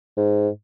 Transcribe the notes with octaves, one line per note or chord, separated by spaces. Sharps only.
G#2